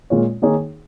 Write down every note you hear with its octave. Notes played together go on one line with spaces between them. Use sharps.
A#2 G#3 F4 C#5
D#3 A#3 D#4 G#4 C#5